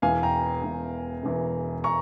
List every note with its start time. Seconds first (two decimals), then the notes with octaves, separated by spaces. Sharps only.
0.02 E1 E2 E3 F5 G#5
0.23 G5 A#5
0.63 E1 E2 E3
1.23 E1 E2 E3
1.84 A#5 C#6